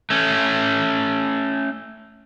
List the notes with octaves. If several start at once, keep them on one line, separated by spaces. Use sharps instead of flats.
A3 C#4